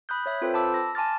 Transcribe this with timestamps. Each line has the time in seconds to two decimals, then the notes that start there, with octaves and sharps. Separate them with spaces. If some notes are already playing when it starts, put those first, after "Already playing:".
0.09 B5 D#6 F#6 G6
0.26 C#5 E5
0.41 C4 F4 A4 B4 C5 G5
0.54 A5 B5 D6 E6
0.74 A#6
0.95 G#5 A5 C6 D6 F6 A6